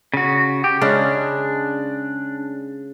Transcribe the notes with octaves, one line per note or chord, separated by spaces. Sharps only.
C#3 F#4
G4
C#3 G#3 C#4 D4